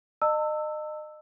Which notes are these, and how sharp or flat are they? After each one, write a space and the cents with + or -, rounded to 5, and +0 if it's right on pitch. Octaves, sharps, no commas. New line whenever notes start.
D#5 -30 A5 +40 E6 +0